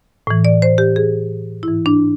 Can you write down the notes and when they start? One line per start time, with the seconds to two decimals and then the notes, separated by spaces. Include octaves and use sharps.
0.27 A2 E3
0.45 D5
0.62 C5
0.78 G4
0.96 G#4
1.63 G#2 E3 E4
1.86 D4